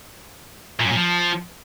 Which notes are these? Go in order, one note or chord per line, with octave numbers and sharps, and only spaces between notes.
A#2
F#2
A#2
F3